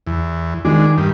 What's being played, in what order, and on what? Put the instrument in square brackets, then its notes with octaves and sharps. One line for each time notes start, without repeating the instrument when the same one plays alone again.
[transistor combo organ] E2
[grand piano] D#3 [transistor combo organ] G#3 D4
[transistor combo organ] G2 D#3